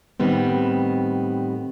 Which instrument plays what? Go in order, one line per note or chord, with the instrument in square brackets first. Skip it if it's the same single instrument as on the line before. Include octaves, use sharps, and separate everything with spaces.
[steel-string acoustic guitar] A2 D#3 G3 B3 C4